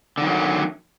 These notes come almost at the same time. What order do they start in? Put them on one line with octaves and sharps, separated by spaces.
D3 D#3 F#3 A3